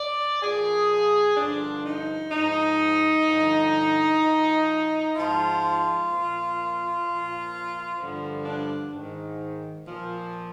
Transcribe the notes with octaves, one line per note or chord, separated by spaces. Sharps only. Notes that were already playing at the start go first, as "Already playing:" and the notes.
Already playing: D5
A#2 F3 G#4
G2 D3 F3 D4
D#4
G#2 F3 D#4
G2 D3 F3
A#2 F3
G#2 F3 F4
A#2 F3
A#2 F3
G2 D3 F3
D4
G#2 D#3
A#2 F3